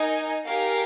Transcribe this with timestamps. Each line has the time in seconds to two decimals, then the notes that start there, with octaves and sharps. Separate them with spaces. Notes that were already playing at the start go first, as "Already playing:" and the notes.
Already playing: D#4 A#4 D#5 G#5
0.47 G4 A#4 F5 G#5